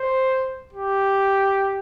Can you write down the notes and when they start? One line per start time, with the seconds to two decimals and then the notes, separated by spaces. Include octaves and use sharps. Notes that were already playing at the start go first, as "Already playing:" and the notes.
Already playing: C5
0.73 G4